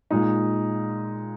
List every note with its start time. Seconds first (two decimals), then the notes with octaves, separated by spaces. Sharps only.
0.10 A#2 G#3 D#4